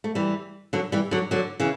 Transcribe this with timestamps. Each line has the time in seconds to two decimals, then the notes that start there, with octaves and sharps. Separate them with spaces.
0.04 A3
0.15 E3 G3
0.73 D3 F#3
0.92 E3 G3
1.11 D3 F#3
1.31 D3 F#3
1.60 C#3 E3